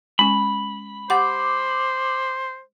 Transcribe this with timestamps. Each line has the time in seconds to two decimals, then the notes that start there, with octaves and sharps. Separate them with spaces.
0.19 G#3 C#4 B5
1.10 G4 C5 F#5 D6